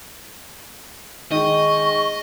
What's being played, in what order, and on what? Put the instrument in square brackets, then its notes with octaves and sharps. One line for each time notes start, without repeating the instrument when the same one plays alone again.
[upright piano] D#3 [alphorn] G#3 [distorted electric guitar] D#5 [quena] C#6